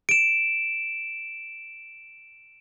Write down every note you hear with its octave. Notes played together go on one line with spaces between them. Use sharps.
D7 E7